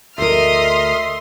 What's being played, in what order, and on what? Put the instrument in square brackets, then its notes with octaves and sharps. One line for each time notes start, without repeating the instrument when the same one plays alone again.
[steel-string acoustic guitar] D2 A#4 [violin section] D#5 D#6 F6 [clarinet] E5 [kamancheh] C6